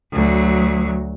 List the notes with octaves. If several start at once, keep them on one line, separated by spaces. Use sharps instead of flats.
D2 F#3